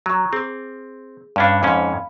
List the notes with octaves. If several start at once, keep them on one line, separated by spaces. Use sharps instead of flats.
F#3 A#5 C#6
C4 G#4
G2 C#4 D4 F5 B5
F2 G#2 C#4